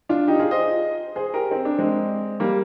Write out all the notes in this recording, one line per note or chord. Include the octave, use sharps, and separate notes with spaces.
D4 F4
D#4 G4
F4 G#4
C5 D#5
G#4 C5
G4 A#4
C4
D4
G#3 C4
G3 A#3